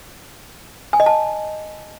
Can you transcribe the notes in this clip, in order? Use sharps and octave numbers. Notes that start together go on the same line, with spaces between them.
G#5
D#5
A5